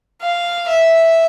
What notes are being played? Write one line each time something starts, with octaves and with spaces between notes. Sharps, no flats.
F5
E5